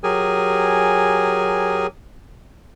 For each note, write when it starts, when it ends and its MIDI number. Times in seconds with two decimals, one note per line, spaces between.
0.04 1.87 54
0.04 1.87 67
0.04 1.87 68
0.04 1.87 70
0.04 1.87 80